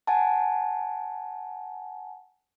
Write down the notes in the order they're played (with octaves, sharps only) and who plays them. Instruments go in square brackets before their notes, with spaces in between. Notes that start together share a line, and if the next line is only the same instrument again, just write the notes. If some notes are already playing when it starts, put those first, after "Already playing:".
[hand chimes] F#5 G#5 A5